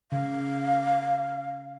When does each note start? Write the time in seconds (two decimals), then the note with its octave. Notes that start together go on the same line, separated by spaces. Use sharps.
0.12 C#3 F5